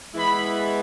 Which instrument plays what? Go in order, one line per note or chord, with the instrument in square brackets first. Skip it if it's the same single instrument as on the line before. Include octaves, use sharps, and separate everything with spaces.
[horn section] E3 G#3 B3 E4 B5